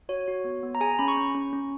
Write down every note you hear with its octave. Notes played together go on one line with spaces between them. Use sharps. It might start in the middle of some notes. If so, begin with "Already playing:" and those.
F#4 C#5
F#4
B3
B3
A#5
G#4 G#5
A#5
C#4 B5
C#6
C#4
C#4
C#4